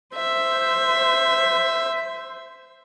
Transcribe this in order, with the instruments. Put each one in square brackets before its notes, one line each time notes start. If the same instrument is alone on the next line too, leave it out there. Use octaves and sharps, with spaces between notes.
[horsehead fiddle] C5 [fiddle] E5